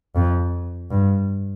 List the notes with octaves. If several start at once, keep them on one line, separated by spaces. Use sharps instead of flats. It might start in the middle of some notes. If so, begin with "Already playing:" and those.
F2
G2